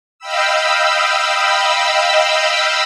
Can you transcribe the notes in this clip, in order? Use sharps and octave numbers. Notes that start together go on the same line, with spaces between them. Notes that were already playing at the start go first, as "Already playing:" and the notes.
D#5 F5 G5 B5 E6